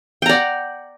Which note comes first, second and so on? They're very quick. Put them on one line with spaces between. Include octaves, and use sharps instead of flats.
G5 A#5 D5 F#5